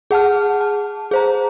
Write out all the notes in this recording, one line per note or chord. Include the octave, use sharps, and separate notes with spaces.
G#4 F#5 A5 F6
A5
G#4 C5 A#5